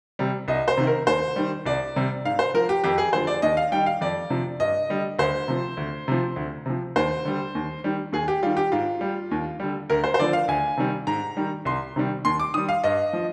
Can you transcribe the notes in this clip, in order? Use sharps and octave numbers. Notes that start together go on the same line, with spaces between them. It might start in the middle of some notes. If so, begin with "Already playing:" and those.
C3 G3
C2 D#5
C5
C3 D#3
A#4
D#2 C5
D#3 G3
C2 D5
C3 G3
G#2 F5
C5
F3 A#4
G4
F2 G4
G#4
D3 F3 C5
D5
D#2 D#5
F5
D#3 G3 G5
F5
F2 D5
C3 F3
G2 D#5
D3 G3
D2 C5
C3 F3
D2
C3 F3
D2
C3 F3
D#2 C5
D3 G3
D#2
D#3 G3
D#2 G#4
G4
D#3 G3 F4
G4
G#2 F4
G3
D#2
D3 G3
D2 A#4
C5
C5
D3 F3 D5
F5
D2 G#5
C3 D#3 G3
G#2 A#5
D#3 G3
C2 C6
C3 D#3 G3
D#2 C6
D6
D#3 G3 D#6
F5
G2 D#5
F3